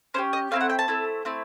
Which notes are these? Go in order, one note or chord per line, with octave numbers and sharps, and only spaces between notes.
C#4 E4 G4 C5
D#5
A3 C4 E4 F5
F#5
G5
A5
A3 C4 E4
A3 C4 E4